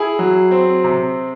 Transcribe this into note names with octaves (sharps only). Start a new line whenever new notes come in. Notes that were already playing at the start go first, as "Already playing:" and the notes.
Already playing: E4 G#4
F#3
C4
C3